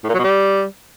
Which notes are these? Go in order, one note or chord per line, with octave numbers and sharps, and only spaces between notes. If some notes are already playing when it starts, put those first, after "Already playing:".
A2
A#2
F#3
B2
G3